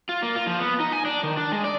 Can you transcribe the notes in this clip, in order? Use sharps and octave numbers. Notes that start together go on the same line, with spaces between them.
F4
A#3
F4
F3
B3
D#4
G#5
D4
D#3
D4
G#3
D5